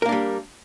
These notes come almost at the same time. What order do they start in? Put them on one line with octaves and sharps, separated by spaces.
A#4 A#3 D4 G3